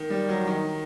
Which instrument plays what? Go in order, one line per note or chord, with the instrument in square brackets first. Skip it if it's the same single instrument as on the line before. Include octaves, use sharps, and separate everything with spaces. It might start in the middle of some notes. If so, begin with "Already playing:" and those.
Already playing: [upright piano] D#3
G3
F#3
D#3